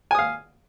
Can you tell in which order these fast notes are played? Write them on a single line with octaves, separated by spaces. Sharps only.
G#5 D#6 F5